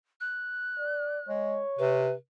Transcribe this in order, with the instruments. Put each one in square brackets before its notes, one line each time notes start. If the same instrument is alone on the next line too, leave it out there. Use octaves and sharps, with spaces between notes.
[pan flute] F#6
[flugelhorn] D5
[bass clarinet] G#3 [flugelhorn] C#5
[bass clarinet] C3 [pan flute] B4